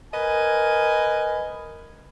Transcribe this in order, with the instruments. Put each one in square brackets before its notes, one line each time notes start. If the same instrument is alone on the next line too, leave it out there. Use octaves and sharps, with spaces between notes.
[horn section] A#4 B4 D#5 G#5